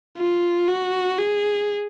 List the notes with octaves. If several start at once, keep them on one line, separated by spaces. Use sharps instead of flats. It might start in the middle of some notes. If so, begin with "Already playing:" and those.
F4
F#4
G#4